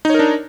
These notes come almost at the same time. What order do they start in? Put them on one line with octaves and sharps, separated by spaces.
D#4 C#5 A#4 D4